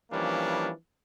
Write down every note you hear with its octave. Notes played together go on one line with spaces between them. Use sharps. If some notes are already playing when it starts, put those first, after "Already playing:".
E3 F3 G3 A#3 C#4 D4